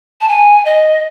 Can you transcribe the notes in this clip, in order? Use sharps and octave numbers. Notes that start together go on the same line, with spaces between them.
A5
G#5
D#5